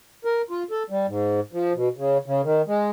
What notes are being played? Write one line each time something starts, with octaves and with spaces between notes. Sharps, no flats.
A#4
F4
A4
G3
G#2
F3
B2
C#3
C#3
D#3
G#3